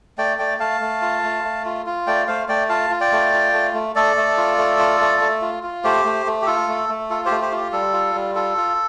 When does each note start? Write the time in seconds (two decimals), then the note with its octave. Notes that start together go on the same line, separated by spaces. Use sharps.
0.18 A3 D5 G5
0.39 A3 D5 G5
0.60 A3 F5 A5
0.81 A3
1.02 F4
1.23 A3
1.44 A3
1.65 F4
1.86 F4
2.07 A3 D5 G5
2.27 A3 C5 F5
2.49 A3 D5 G5
2.69 F4 F5 A5
2.90 F4
3.01 D5 G5
3.12 A3
3.33 F4
3.53 A3
3.74 A3
3.96 A3 A4 D5
4.17 A3
4.38 F4
4.58 A3
4.79 F4
5.01 A3
5.21 A3
5.42 F4
5.63 F4
5.84 A3 G4 C5
6.05 A3
6.26 A3
6.42 G4
6.46 F4 A4
6.68 A3
6.89 A3
7.10 F4 A4
7.26 G4 C5
7.31 A3
7.42 G4 C5
7.52 F4 G4
7.73 G3 A4
7.93 F4
8.15 G3
8.35 F4 A4
8.57 F4